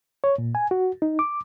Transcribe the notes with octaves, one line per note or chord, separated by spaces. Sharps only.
C#5
A#2
G#5
F#4
D#4
D6